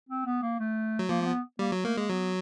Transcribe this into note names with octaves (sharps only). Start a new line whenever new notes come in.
C4
B3
A#3
A3
F#3
F3 A#3
A#3
B3
G3 A#3
F#3
A3 A#3
G#3 A#3
F#3 B3